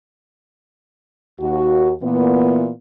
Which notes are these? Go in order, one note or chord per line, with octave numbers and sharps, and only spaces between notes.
D#2 F#4
A#2 E3 B3